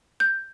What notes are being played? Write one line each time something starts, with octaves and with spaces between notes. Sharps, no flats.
G6